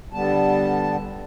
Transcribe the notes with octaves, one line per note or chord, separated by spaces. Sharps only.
D3 G3 B3 A5